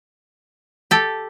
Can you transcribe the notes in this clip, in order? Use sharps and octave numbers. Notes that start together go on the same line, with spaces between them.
G4 A4